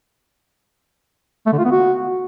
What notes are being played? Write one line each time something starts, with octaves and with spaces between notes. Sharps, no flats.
A3
D3
F4
B3
F#4